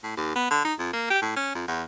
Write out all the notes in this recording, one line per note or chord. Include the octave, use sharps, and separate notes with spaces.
A2
D#2
B3
D3
D#4
F2
A#3
G4
A2
C#4
F2
E2